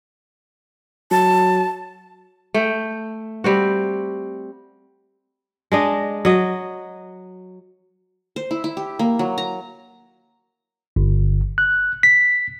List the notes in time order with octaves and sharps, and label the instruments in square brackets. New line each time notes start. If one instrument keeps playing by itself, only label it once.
[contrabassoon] F#3 [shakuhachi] A5
[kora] A3 G5
G3 C4 F#4
G#3 D4 D#5
F#3 D#5
[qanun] C5
E4
E4
G4
A#3
F#3
A#5
[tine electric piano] G1
F#6
B6